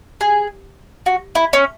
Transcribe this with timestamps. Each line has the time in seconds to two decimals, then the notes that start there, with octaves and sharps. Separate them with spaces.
0.21 G#4
1.06 F#4
1.35 E4
1.53 C#4